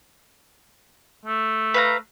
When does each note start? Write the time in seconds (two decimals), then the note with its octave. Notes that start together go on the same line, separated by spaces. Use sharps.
1.26 A3
1.74 B4 F5 A#5